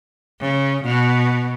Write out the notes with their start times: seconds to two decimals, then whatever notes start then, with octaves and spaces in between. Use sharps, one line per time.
0.40 C#3
0.84 B2